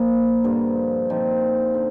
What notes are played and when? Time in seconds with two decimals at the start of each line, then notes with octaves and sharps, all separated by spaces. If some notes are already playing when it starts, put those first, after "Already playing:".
Already playing: A#2 F3 A#3
0.44 G2 D3 F3
1.09 A#2 F3 C4 D#4
1.74 D3